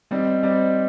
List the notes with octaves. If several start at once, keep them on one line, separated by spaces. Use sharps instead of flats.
G3 C4 D#4
G3 C4 D#4